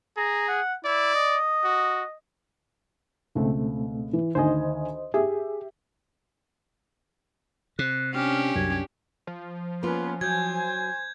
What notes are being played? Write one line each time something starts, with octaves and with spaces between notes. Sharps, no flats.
G#4 A#5
F#5
E4 D5
D#5
F#4
C#2 B2 A3 C4
E3
D2 D#3 C5 D#5 G#5
G4 G#4 E5
C3 F#6
C#4 D4 G4 F6
C2 F#2 G#6
F3
A#3 B3 C#4 F4 B4
F#3 C5 G#5 G6 G#6